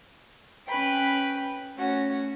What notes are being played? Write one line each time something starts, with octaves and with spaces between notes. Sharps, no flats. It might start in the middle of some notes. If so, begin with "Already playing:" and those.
C#4 B4 G5 B5
A3 C#4 F#4